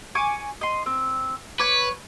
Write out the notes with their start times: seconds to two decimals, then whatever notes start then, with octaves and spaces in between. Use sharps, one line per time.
0.15 G#5 C#6 D6
0.61 D#5 C6
0.86 C4
1.60 B4 C#5 D6